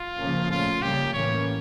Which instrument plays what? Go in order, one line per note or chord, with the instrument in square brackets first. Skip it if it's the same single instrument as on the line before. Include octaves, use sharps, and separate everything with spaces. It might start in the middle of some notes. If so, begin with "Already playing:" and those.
Already playing: [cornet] F4
[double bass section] C#3 F3 A#3 C#4
[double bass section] A#2 A3 C#4 [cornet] F4
[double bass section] C#3 G3 A#3 C#4 [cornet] G4
[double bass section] A2 E3 A#3 C#4 [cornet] C#5